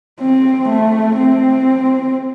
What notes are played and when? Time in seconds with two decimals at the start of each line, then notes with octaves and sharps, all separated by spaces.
0.20 C4
0.68 A3
1.15 C4